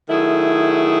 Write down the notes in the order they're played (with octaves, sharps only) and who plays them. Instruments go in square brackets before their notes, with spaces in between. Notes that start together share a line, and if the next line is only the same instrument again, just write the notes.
[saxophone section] D#3 F#3 A3 E4 G#4